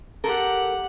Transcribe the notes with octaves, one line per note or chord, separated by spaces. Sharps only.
G4 A4 A#4 F#5